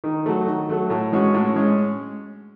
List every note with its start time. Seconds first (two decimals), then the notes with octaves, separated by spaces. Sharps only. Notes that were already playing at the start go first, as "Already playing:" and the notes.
0.04 D#3
0.26 F#3 A3
0.47 D#3
0.69 F#3 A3
0.90 A2
1.12 E3 G#3 C#4 F#4
1.34 A2
1.56 G#3 C#4